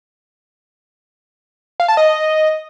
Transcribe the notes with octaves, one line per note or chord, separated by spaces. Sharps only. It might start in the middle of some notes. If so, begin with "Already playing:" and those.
F5
A5
D#5